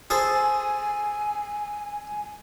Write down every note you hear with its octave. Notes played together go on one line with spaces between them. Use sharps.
G#4 A4 C5 G#5